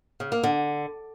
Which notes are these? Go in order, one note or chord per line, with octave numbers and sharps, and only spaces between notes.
C#3
A#3
D3